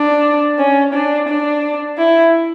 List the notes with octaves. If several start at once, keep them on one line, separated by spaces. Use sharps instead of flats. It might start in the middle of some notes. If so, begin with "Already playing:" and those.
Already playing: D4
C#4
D4
D4
E4